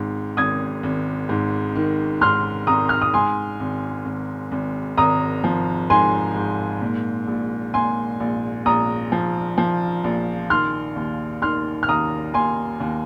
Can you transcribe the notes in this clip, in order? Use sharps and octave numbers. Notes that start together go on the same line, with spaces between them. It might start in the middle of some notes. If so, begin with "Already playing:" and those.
Already playing: G#1 G#2
G#1 D#6 G#6
G#1
G#2
D#3
G#2 C6 F6
G#1 A#5 D#6
F6
D#6
G#2 G#5 C6
G#1
G#1
G#1
G#1 A#5 D#6
F3
G#2 G#5 C6
G#2
A#2
A#1
A#2 G#5 C6
A#1
A#1 A#5 D#6
F3
F3
A#1
D#3 C6 F6
D#2
D#3 C6 F6
F6
D#2 A#5 D#6
D#2 G#5 C6
D#2